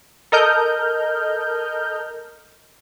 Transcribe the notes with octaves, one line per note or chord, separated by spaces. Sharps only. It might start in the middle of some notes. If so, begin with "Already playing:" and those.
A4 A#4 D#5 F6 G6